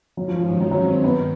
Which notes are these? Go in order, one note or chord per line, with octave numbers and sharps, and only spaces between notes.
G2 D#3 F#3 G#3 C#4
F3
F3
F3
F#3
F#3
C4
C4
G2 D#3 G3 B3